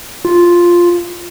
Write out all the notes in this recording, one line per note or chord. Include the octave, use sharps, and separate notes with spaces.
F4